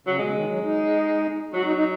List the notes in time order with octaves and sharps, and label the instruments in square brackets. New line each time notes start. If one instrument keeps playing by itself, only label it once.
[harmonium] C#3 [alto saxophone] F#3
[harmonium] B2 [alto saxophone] G#3
[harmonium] C#3
D#3
F#3
D#4
[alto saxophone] F#3 [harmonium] F#4
[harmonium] D#4
D#4